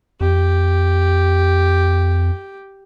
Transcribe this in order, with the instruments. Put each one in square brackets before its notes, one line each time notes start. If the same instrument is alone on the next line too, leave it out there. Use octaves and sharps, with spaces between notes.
[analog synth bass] F2 [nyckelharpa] G4